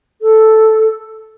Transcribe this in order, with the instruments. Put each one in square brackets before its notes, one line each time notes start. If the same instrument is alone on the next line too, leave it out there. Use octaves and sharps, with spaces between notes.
[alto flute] A4